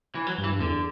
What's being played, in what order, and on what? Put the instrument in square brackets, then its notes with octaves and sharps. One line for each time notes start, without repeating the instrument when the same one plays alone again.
[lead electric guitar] E3
F#3
[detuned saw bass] G2
[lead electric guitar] E3
[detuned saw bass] G2
[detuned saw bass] E2 [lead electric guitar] D3